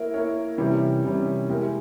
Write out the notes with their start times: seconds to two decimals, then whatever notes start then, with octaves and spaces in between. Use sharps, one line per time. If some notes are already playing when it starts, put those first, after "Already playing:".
Already playing: A#3 E4 A#4 C#5
0.14 A#3 E4 A#4 C#5
0.58 C3 E3 G3 C#4
1.03 C3 E3 G3 C#4
1.49 G#3 E4 G4 A#4